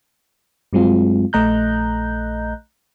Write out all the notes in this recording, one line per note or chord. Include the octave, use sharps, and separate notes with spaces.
G2 F#3 G#3 C4 F4
A#1 A3 D#5 A#5 F#6 G6